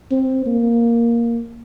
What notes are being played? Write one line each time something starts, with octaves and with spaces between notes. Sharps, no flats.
C4
A#3